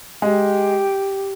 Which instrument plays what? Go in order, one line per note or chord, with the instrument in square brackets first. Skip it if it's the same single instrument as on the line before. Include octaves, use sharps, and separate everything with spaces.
[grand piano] G#3 [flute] G4